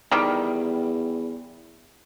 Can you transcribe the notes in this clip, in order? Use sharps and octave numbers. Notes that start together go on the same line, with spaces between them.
E2 D#3 G3